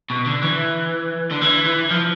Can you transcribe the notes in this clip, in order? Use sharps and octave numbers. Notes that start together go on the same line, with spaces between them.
B2
D3
E3
D3
E3
E3
F3